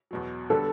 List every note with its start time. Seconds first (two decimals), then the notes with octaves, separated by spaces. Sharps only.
0.11 E2 B2 F#3
0.50 D3 G3 B3 D4 A4